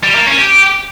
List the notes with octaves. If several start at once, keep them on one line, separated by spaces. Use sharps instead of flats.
G3
A#3
C#4
G4